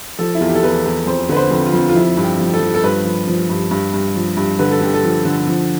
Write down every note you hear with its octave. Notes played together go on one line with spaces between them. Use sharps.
F3 A4
E4
E2 F4
G4
A4
E2 B4
E2
F2 C5
D3 B4
C5
F2
F4
F2
F4
F3 E4
G2
G4
F3
A4
F3
A4
G2 B4
F3
F3
G2
G2
G2
F3
G2
D3 B4
A4
D3 G4
A4
F3
D3
F3